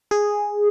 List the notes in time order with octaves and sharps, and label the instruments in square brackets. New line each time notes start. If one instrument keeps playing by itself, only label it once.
[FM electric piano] G#4